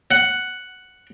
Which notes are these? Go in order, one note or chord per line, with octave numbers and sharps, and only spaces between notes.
F#5